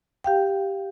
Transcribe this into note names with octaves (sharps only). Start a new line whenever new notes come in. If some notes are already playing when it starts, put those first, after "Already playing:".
G4 F5 G5